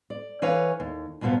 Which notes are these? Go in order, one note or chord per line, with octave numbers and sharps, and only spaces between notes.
D5
E3 B4 C#5 F5 G#5
D#2
D2 G2 B2 F3 B3 A#4